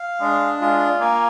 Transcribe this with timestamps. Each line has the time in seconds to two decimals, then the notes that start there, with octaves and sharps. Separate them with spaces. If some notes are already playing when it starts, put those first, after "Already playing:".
Already playing: F5
0.21 G#3 D4
0.61 G#3 F4
1.00 A#3 G#5